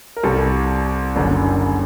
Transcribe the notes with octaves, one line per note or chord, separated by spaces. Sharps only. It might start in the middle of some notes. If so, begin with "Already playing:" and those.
A#4
C2 C3 G3 A4
F#1 F#2 D3